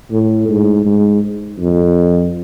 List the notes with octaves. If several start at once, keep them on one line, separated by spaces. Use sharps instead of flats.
A2
G#2
G#2
F2